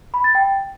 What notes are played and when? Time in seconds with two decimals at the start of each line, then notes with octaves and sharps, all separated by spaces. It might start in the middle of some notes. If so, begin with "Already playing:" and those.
0.14 B5
0.24 A6
0.35 G5